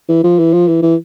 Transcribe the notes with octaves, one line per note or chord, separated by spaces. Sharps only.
E3
F3
E3
F3
E3
E3